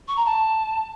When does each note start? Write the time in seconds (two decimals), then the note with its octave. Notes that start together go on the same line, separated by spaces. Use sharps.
0.08 C#6
0.16 A#5
0.25 A5